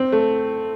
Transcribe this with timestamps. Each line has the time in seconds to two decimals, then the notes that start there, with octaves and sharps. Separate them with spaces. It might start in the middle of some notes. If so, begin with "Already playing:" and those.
Already playing: C4
0.12 A3